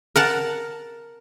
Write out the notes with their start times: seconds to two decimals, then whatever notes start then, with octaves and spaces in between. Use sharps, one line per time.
0.16 A#4 F#5 A5